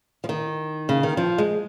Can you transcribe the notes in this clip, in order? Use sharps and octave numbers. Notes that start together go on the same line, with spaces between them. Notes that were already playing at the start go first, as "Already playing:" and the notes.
F3
D#3
C#3
D#3
F3
G#3